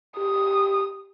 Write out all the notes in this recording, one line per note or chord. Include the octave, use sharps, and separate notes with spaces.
G4 D#6